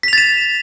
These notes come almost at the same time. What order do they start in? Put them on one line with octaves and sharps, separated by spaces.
B6 F7 A6 E7